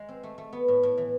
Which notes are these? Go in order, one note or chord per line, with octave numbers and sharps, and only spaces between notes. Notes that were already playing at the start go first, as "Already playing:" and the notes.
Already playing: G#3
C4
A3
A3
B3
A2
A2
E3